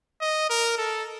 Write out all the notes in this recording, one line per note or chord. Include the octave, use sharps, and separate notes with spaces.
D#5
A#4
A4